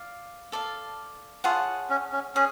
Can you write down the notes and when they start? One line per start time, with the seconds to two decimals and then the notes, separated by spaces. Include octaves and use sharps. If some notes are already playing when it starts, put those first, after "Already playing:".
Already playing: D5 F5
0.52 A4 D5 F5
1.44 F4 G#4 C#5 F#5 A5
1.90 C#4
2.13 C#4
2.35 C#4 G#4